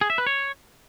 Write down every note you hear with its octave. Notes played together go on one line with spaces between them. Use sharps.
G#4
E5
B4
C#5